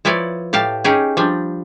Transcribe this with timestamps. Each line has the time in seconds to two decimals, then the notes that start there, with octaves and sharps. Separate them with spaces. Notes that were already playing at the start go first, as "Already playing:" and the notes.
0.05 F3 E4 B4 C#5 D5
0.53 A2 G4 F5 A5
0.84 C#4 D#4 G4 G#4
1.17 F3 G3 D4